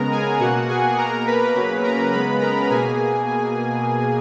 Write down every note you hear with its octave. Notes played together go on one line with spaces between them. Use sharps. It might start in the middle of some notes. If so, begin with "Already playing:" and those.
Already playing: C#3 G#3 B3 A#4 A#5
G#4 G#5
B2 A#3 F#4 F#5
G#4 G#5
B2 A#3 A#4 A#5
B4 B5
C#3 F#3 A#3
A#4 A#5
C#3 G#3 B3 B4 B5
A#4 A#5
B2 A#3 G#4 G#5